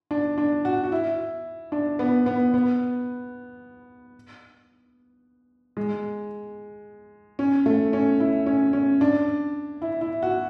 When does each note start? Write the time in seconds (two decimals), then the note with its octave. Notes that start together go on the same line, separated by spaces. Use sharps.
0.11 D4
0.38 D4
0.65 F#4
0.84 F#4
0.92 E4
1.72 D4
1.99 B3
2.26 B3
2.54 B3
5.77 G#3
7.39 C#4
7.66 A3
7.93 C#4
8.20 E4
8.46 C#4
8.73 C#4
9.01 D4
9.82 E4
10.01 E4
10.23 F#4